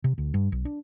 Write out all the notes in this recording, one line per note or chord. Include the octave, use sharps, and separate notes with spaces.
C3
D2
G2
B1
D4